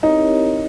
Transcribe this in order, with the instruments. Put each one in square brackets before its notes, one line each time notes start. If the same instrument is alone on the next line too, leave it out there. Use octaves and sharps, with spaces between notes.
[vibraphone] C4 E4 G4 A#4 C#5 [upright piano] D#4